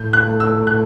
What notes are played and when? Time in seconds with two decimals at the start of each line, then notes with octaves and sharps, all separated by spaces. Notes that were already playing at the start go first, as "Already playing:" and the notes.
Already playing: A2 G6
0.13 F#6
0.27 A3
0.40 E6
0.67 A2 F#6